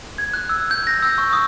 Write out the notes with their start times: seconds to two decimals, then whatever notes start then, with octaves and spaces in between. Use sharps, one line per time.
0.18 G#6
0.34 F#6
0.49 E6
0.71 G6
0.87 A#6
1.02 E6
1.18 C#6
1.33 D#6